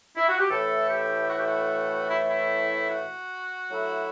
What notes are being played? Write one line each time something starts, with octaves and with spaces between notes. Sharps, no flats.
E4
F#4
G4
A2 E3 A3 E4 A4
G4
F#4
G4
F#4
E4
E4
F#4
F#3 A3 E4